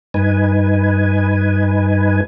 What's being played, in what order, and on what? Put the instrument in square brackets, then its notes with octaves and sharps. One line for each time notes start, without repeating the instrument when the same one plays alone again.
[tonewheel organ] G2 D#4 B4 G#5